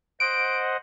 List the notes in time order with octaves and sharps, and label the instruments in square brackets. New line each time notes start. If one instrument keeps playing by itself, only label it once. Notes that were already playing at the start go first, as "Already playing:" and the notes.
[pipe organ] C5 D#5 F#5 [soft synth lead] D7